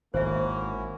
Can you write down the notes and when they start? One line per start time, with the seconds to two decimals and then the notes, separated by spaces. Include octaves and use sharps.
0.14 G#1 A#3 C#4 E4 F#4 C5 E5